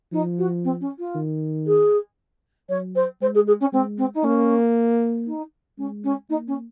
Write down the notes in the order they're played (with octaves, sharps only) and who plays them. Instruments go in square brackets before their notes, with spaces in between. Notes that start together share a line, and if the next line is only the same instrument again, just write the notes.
[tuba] F3 [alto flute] D#4
[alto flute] F#4
C4
C#4
F4
[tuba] D#3
[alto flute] G#4
[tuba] F#3 [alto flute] C#5
[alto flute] C5
[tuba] G#3 [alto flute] C5
[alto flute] G#4
G#4
C#4
[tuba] G#3 [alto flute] C4
[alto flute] C4
D#4
[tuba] A#3 [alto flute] C#4
[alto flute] D#4
[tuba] G#3 [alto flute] C#4
[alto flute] C#4
[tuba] A#3 [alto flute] D#4
[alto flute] C#4